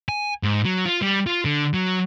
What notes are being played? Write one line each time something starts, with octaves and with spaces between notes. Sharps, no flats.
G#5
G#2
F#3
F4
G3
F4
D3
F#3